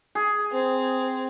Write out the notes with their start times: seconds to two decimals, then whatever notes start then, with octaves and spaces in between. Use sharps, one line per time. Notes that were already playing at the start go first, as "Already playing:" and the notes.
0.15 G#4
0.52 C4